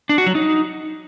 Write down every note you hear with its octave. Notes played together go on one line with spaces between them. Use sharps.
D4
F#4
F#3
D#4